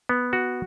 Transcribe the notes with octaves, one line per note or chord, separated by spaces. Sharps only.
B3
F#4